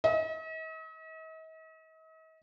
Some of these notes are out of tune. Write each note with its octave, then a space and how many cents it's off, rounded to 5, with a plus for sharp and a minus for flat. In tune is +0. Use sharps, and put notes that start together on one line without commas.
D#5 +45